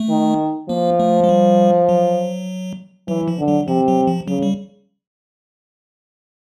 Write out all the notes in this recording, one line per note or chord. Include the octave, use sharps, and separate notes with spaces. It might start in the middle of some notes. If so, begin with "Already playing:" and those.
Already playing: A3
D#3
F3 A#3
A3
G#3
G3
F#3
E3 F#3
F3
D3
F#3
C3 F3
F#3
F3
C#3 F#3
G3